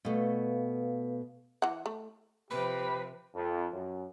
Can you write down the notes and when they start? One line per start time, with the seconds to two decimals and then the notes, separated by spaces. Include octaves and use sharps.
0.05 B2 A3 B4 F5
1.62 E3 F#5
1.86 A3
2.51 C3 F3 G4 B4 B5
3.35 F2
3.72 F#2